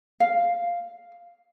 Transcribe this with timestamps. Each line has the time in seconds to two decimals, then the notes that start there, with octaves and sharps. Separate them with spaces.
0.20 F5